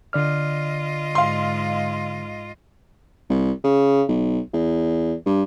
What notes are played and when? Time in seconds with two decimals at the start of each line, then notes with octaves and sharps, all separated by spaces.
0.13 D3 F4 D5 D#5 F6
1.15 G#2 F5 C6
3.30 C2
3.64 C#3
4.08 B1
4.53 E2
5.26 G2